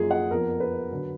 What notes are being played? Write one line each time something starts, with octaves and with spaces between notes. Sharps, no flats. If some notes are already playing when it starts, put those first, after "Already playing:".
Already playing: F#2 F3 A#3 F4 G#4
F#5
F2 F3 B3 A#4
B4
D3 F#3